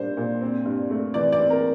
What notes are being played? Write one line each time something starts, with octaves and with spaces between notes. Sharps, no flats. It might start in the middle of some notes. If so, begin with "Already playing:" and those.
Already playing: A#2 G3 A#3 D4 C5
A#2
C4
G2
A3
E3 D5
D5
C4
A#4